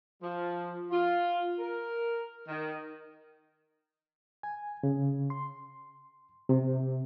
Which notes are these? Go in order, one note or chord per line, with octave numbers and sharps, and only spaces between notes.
F3
F4
A#4
D#3
G#5
C#3
C6
C3